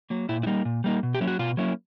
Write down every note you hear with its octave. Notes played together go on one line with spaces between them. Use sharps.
F#3 A#3
A#2 E4
E4
G3 A#3 D#4
A#2
G3 A#3 D#4
B2
G4
F#3 A#3 C#4 E4
F#4
B2 F4
F#3 A#3 C#4 E4